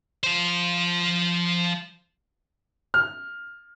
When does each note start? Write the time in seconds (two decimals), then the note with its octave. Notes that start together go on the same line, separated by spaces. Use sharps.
0.24 F3 C5
2.94 F6